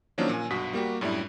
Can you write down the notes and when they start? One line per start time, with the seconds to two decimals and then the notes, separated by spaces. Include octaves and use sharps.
0.18 D#3 F3 F#3 A#3 C#4 D4
0.29 A#2 G#5
0.51 B1 G2 F#4 D#6 B6
0.73 G3 A#3 F#4 G4
1.01 F#2 A2 G3 D4 E4